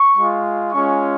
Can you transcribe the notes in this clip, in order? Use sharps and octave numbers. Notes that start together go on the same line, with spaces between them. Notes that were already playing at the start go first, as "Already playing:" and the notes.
Already playing: C#6
G#3 F4
G#3 C#4 F4 C#6